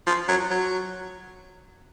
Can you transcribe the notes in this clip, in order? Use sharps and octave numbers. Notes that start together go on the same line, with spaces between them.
F3
F#3
F#3